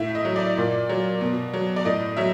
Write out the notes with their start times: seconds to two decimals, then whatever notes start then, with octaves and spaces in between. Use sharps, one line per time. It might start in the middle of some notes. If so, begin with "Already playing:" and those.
Already playing: A2 E5
0.15 D#5
0.25 F#3
0.36 D5
0.58 A#2
0.89 F#3
1.21 B2
1.53 F#3
1.76 D5
1.85 A2 D#5
2.17 F#3 E5